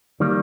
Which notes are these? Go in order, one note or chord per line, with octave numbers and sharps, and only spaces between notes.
D#3 G3 A#3